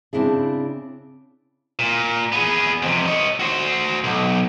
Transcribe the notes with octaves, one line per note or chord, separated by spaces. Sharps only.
C#3 A#3 C4 D4 E4 G#4
A#2
B3 G#4
F2 C3
C#5 D#5
F#4 C5
B1